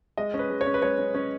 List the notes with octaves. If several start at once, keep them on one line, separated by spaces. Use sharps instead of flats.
G#3 D#5
C#4
B4
G#3
C#5
C#4
B4
G#3 C#5
C#4
C#4